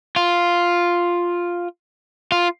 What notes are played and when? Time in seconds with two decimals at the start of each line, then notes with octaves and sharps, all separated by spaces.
0.16 F4
2.32 F4